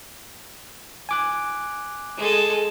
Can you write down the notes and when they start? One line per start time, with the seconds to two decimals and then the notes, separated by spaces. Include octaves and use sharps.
1.09 G#5 D6 F#6
2.17 G#3 A4